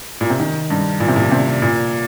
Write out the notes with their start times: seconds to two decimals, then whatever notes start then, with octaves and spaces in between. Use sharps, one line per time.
0.21 A#2
0.30 C3
0.40 D#3
0.70 G2
1.00 A#2
1.08 C3
1.16 A#2
1.31 C3
1.62 A#2